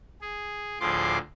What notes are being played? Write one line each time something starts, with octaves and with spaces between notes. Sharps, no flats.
G#4
D2 A2 F3 G#4 C6 D6